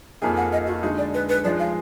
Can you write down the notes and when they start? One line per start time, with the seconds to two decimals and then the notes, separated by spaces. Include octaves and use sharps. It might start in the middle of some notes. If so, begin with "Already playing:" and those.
0.22 F2 F3 A#3 D#4 G#4 G#5
0.37 F#5
0.52 D#5
0.67 F#4
0.83 D3 G#3 D#4 F#4
0.98 D5
1.14 B4
1.29 B4
1.44 F3 G#3 D#4 D5
1.60 F5